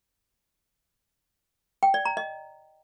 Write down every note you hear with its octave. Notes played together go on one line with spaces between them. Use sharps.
G5
D5
A#5
D#5